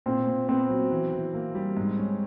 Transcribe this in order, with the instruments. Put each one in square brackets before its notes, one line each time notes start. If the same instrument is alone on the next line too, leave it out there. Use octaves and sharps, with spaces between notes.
[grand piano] A#2 [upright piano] C4
[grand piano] A#2
[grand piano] B3 [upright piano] C4
[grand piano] F#3
E3
E3
A#3
G3
G#2
C#4